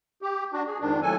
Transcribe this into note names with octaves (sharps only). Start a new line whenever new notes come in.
G4
D4 F#4
G#4
F2 G#2 D#3 D4
D#2 A2 D#3 F#3 A4 G#5